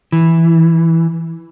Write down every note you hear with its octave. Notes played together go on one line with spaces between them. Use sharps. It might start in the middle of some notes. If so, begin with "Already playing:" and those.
E3